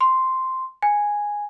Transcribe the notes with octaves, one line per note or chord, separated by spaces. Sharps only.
C6
G#5